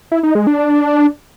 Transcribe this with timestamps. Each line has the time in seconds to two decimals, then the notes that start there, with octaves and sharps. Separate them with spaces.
0.12 E4
0.23 D#4
0.35 G#3
0.47 D4
0.59 D4